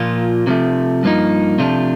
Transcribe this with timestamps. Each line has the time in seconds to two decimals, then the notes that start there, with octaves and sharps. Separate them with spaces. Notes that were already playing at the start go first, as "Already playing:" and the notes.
Already playing: A#2 F3 A#3 F4
0.47 C3 F3 A3
1.03 G2 F3 A#3 D#4
1.59 C3 F3 A3 D4 F4